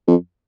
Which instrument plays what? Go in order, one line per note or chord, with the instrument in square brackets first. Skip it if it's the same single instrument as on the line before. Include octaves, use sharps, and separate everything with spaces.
[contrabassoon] F2